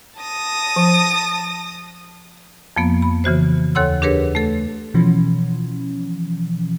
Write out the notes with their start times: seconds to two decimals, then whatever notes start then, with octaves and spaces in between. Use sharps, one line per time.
0.20 A5 D#6 A#6
0.76 F3
2.76 F2 F3 A#3 B3
3.02 B5
3.24 C#3 E3 F#4 C5
3.75 D#2 A4 C#5 F#5 C6 E6
4.02 D4 G4 G#4 A#4 B4 C#5
4.35 A3 A4
4.94 B2 E3 F3 C#4